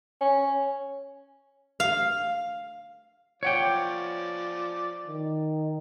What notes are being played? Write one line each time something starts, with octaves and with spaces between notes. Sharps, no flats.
C#4
F5
F3 C#5 D5 F#5 G5
D#3